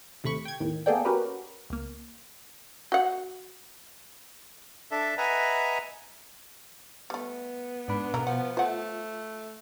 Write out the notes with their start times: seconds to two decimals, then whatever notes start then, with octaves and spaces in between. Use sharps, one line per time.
0.24 D#2 C3 A3 B5 C#6
0.45 G5 G#6
0.60 E2 A2 D#3
0.86 A#3 B3 G#4 A4 D5 G5
1.05 C#4 F#4 G4 A#4 B4
1.70 C#2 A#3
2.92 F#4 F#5
4.91 D4 A4 E5
5.18 B4 D#5 E5 F#5 G#5 A#5
7.10 G3 A3 B3
7.88 G#2 D4 B5
8.14 B2 A3 C#4 A#4
8.27 F3 F#5
8.57 A3 F4 C5 F#5